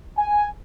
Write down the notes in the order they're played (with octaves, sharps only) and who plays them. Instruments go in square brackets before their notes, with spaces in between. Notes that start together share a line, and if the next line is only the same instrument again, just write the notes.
[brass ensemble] G#5